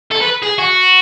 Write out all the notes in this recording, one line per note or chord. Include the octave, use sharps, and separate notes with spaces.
A4
B4
G#4
F#4